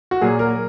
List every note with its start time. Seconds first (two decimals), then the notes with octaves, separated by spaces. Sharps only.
0.11 F#4
0.21 A#2 F#3 A#3 G#4
0.39 A#4